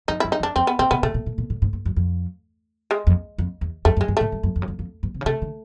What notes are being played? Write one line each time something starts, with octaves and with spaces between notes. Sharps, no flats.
F2 D#4
F#2 E4
D#4
F2
D4
F2 C4
B3
A#2 C4
B2 B3
B2 A3
A#2
A#2
A#2
A2
G#2
G2
F#2
F2
G#3
F2
F2
E2
F2 A3
F#2
G#3
G2
A2 A3
G2
F#2
F2
F#2
F2
F2
G2
C3
C#3
C3 A3
D3